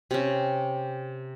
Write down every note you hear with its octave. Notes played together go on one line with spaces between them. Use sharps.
C3 C#4